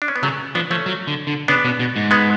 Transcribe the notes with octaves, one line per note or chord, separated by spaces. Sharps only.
D4
C#4
B3
C#3 F#3 A3
F3 B3 D4
F3 A3 C#4
F#3
D3
D3
C#3 B3 D4
B2
B2
G#2
G#3 B3